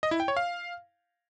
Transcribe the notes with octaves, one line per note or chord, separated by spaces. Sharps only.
D#5
E4
G5
C#5
F5